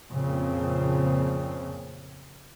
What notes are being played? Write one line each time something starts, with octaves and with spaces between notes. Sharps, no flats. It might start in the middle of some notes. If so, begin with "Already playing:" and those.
F2 A#2 C#3 F3 C4